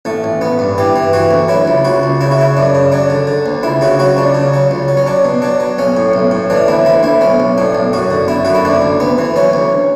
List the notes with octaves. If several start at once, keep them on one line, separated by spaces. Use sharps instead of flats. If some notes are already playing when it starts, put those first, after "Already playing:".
A1 A3
A1
A1 B3
G2
E3 G4
E3
E3 F#4
D2
F#3 E4
C#2
C#2 F#4
C#2
C#3 E4
F#4
C#3 E4
F#2 D4
C#3
F#3 D4
D3
D3
D2
C#2 E4
C#3 F#4
F#3 F#4
C#2 D4
C#3
F#3
C#2
F#3
C#4
F#3 D4
B2
F#3 D4
F#3
B1 C#4
A2
B1
A2
E3 D4
D2 E4
D2 E4
D2 E4
B1 C#4
B1
A2 D4
B1
F#2 F#4
D3
D3 E4
F#2 F#4
E4
D2 D4
D2
D2 B3
E3
F#3 C#4
D2